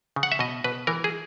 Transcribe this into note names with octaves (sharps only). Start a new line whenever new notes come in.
C#3
F#5
E5
B2 D#5
B2 B4
E3 A#4
G#4